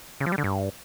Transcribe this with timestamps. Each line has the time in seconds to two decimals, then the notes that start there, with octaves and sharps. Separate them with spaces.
0.20 C#3
0.26 F3
0.32 G3
0.38 D3
0.44 G2